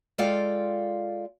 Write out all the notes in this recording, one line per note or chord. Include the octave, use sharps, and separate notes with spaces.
G#3 F4 A4 D5 F5 G5